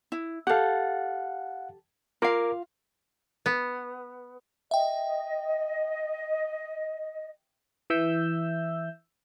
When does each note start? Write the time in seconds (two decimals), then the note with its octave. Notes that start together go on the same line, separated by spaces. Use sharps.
0.12 E4
0.47 G4 A4 F5 F#5
2.22 F4 A#4 F5 D6
3.46 B3
4.71 D#5 E5 G5
7.90 E3 E5 E6 G6